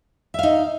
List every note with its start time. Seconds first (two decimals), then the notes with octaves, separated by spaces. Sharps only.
0.34 E5
0.39 F5
0.43 D#4